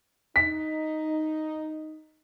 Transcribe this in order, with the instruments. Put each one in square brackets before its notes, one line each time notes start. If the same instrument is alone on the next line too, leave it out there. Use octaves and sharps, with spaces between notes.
[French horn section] D#4 [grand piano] B6